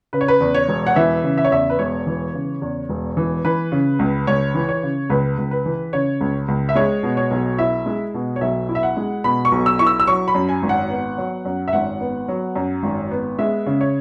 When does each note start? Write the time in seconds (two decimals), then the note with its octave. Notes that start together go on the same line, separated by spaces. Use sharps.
0.13 C#3 B4
0.21 C#5
0.28 B4
0.40 E2
0.54 C#5
0.68 E1
0.87 F#5
0.96 E3 E5
1.24 C#3
1.37 E5
1.45 C#5
1.51 E2 E5
1.70 B4
1.79 E1 C#5
2.07 E3
2.34 C#3
2.62 E2
2.89 E1
3.17 E3
3.45 E3 B4
3.72 C#3
3.99 C#2
4.27 C#2 C#5
4.55 E3
4.69 C#5
4.83 C#3
5.10 C#2 B4
5.38 C#2
5.51 B4
5.66 E3
5.93 C#3 C#5
6.21 C#2
6.48 C#2
6.69 E5
6.75 G#3 C#5
7.03 B2
7.17 C#5
7.31 B1
7.58 E4 E5
7.86 G#3
8.14 B2
8.36 C#5
8.41 B1 E5
8.69 E4
8.75 E5
8.83 F#5
8.97 G#3
9.24 B2 B5
9.45 C#6
9.52 B1
9.66 E6
9.79 E4 C#6
9.87 E6
10.00 E6
10.07 F#3 C#6
10.28 B5
10.35 F#2
10.49 G#5
10.62 G#1
10.69 F#5
10.90 B3
11.18 F#3
11.45 F#2
11.68 E5
11.73 G#1 F#5
12.00 B3
12.28 F#3
12.56 F#2
12.83 G#1
13.11 B3
13.39 G#3 E5
13.66 C#3
13.81 C#5